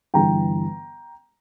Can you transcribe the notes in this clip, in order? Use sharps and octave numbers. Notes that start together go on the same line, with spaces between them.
G1 G2 E3 G5 A#5